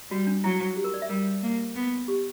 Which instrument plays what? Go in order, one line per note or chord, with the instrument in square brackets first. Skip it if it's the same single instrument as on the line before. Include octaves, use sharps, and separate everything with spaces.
[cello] G3 [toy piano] F#4
[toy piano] D4
[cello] F#3 [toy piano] E4
[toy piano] G4
A#4
D5
E5
[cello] G3 [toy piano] A#4
[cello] A#3
B3
[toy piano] G4